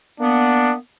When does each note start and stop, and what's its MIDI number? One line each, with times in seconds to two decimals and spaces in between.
0.20 0.75 58
0.20 0.75 59
0.20 0.73 62